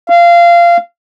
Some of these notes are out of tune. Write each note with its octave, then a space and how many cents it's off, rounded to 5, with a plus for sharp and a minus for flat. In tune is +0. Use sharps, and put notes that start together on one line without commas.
F5 -20